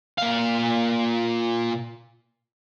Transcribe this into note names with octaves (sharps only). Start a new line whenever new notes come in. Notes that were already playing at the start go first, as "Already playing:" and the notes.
A#2 F5